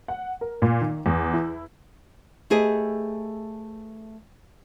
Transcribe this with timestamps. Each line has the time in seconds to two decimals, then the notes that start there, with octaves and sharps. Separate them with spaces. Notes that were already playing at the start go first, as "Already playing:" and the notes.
0.08 F#5
0.41 A#4
0.62 A#2
0.81 D#3
1.06 E2
1.34 E4
2.50 A3 G4 G#4 B4 D#5